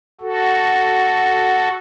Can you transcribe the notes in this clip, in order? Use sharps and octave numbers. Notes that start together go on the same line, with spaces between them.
F#4 A4